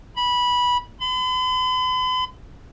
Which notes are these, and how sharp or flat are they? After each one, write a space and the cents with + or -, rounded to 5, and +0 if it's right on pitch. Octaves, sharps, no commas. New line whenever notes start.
B5 -15
B5 +45